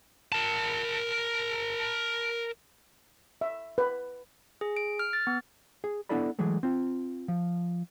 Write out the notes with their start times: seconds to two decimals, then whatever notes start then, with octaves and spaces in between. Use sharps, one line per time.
0.32 A#4 A5
3.41 E5
3.78 B4
4.61 G#4
4.77 D7
4.99 F6
5.13 A6
5.27 B3
5.84 G#4
6.09 B3 D4 E4 A4 D5 B5
6.39 E3 F#3 G#3 A3
6.63 C4 F4
7.28 F3